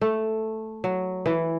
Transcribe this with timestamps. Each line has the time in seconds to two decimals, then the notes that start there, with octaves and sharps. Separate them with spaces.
0.01 A3
0.84 F#3
1.26 E3